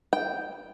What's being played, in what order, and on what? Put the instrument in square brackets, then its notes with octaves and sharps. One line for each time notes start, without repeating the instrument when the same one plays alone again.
[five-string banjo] G5